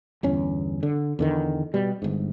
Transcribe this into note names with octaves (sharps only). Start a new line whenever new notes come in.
G1 E2 C#4
D3
E2 D3 D#3
B2 G3
G1 G#2